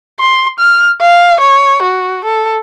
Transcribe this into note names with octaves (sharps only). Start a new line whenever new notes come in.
C6
F6
F5
C#5
F#4
A4